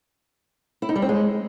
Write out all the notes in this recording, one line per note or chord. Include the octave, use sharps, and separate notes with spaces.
E4
D#4
G3
C4
G#3